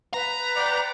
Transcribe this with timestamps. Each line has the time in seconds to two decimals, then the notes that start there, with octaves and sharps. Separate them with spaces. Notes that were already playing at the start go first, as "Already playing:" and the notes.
0.14 B4 A#5
0.56 D5 F#5 G5